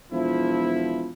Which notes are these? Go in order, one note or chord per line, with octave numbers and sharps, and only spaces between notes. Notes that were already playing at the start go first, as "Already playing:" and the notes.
E1 F3 E4